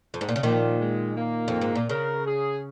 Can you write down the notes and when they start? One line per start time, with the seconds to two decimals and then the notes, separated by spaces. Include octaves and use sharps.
0.14 F2
0.21 G#2
0.29 A#2
0.36 C#3
0.43 A#2 D#3 F3
0.80 G#3
1.16 A#3
1.48 F2
1.61 G#2
1.75 A#2
1.89 C#3 A#4
2.26 G#4